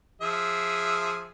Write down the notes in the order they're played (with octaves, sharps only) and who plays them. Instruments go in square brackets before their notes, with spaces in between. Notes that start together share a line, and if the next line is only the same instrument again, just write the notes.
[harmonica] F3 G#4 E5